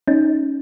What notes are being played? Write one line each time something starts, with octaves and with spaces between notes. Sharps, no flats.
C#4 D#4